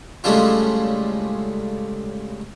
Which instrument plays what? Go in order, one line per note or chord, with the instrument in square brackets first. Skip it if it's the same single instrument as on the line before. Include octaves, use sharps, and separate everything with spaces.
[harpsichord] A2 C#3 G3 G#3 D4 F4